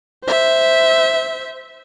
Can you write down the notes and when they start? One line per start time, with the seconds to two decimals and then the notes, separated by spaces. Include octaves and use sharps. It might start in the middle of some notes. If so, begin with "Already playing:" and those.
0.24 C5 E5